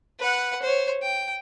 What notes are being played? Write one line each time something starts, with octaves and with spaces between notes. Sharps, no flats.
B4 F#5
C5 C#5
G5